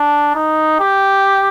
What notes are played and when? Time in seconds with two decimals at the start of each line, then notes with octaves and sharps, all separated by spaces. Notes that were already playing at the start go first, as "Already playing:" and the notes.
Already playing: D4
0.35 D#4
0.80 G4